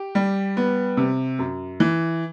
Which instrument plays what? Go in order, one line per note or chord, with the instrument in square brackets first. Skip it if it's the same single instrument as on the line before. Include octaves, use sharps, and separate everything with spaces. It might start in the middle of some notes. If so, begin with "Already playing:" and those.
Already playing: [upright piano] G4
G3
B3
C3
F#2
E3